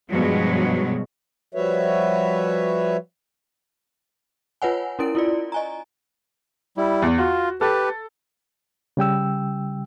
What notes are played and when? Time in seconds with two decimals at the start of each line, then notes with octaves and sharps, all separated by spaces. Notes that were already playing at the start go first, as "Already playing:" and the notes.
0.10 G2 B2 F3 F#3 G#3
1.55 F3 G3 F#4 B4 C#5 E5
4.62 F4 B4 C#5 F#5 G#5
4.99 C#4 E4 A#4 D7
5.15 E4 F4 D5
5.52 D#5 G#5 A#5
6.77 G3 E4
7.02 E2
7.18 F4 F#4
7.61 G4 A4 B4
8.97 C#3 G3 G5 E6